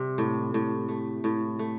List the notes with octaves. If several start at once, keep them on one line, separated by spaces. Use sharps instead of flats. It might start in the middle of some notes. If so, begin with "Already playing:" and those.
Already playing: C3 G3
A2
A2
A3
A2
A3